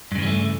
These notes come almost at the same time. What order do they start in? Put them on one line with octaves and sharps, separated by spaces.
G2 C#3 E3 G3 A3